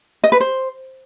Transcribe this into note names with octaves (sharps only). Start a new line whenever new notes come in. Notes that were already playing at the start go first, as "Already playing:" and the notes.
D#5
B4
C5